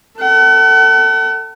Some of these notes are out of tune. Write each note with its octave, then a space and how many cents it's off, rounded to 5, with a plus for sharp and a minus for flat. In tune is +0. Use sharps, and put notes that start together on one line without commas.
A4 +25 F#5 +40